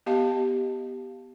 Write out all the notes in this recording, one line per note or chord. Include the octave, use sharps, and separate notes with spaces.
B3 G4 D#5 F5 A5